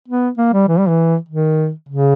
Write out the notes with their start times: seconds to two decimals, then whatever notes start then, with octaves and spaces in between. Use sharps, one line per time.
0.08 B3
0.38 A#3
0.53 G3
0.68 E3
0.79 G3
0.88 E3
1.28 D#3
1.88 C#3